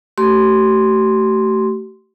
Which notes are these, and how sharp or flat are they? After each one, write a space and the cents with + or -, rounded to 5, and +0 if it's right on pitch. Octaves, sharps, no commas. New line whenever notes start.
A3 +10 G4 -40 C6 +0